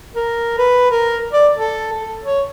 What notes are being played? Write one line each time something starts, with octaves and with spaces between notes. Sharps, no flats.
A#4
B4
A#4
D5
A4
A4
C#5